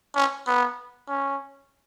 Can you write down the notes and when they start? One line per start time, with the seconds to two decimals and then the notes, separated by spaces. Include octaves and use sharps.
0.16 C#4
0.47 B3
1.08 C#4